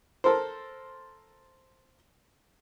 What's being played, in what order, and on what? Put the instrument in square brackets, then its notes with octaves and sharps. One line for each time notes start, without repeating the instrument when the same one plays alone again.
[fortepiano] A4 A#4 C5